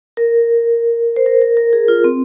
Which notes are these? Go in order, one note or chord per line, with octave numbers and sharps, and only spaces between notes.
A#4
C5
A#4
A#4
A#4
G#4
F4
C4